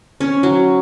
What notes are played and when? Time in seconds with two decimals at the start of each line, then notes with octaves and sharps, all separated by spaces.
0.20 C#4
0.43 F#3